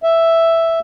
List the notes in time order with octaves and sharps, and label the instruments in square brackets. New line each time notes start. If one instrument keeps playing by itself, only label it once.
[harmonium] E5